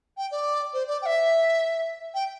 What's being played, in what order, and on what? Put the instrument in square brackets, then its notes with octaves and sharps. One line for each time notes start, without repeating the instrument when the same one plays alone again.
[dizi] G5
D5
C5
D5
G5
E5
G5